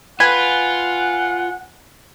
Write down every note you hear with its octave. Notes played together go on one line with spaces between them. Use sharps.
F4 B4 F#5 G#5